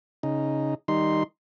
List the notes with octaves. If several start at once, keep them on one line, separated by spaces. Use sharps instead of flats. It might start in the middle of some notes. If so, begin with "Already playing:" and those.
C#3 D#4
D#3 G3 D#4 C6